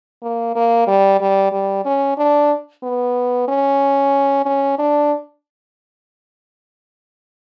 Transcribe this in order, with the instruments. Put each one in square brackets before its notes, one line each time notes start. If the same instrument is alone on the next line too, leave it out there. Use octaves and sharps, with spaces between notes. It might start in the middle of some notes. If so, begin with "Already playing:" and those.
[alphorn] A#3
A#3
G3
G3
G3
C#4
D4
B3
C#4
C#4
D4